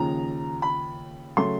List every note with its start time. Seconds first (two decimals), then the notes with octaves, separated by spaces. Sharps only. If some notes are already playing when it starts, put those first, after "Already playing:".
Already playing: D#2 C#3 F3 A#5
0.62 B5
1.37 C#3 F#3 A3 C6